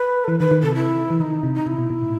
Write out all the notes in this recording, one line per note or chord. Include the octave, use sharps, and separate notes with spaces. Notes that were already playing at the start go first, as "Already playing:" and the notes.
Already playing: B4
A4
E3 B4
D#3 B4
D#3
C3 A4
E4
E3
D#3 D#4
C3
D#4
C3 E4
B2
B2
A2